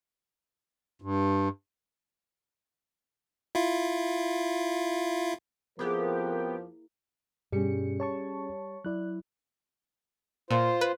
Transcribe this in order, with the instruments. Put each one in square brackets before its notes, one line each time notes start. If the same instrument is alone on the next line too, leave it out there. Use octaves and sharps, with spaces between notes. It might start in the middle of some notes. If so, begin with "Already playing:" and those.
[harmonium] G2
[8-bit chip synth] E4 F4
[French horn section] F2 A#4 [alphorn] F3 [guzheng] A#3 E4 G#4 [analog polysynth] B3 G4
[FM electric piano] G2 B2 C#7 [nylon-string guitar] G3 [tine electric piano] C#4 G#4
[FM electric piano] C#5 A5 C#6
[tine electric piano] F#3 E4 [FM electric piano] D5 F#6
[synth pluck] A#2 [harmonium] F4 C5
[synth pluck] B4